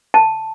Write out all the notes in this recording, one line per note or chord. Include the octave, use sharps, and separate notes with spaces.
A5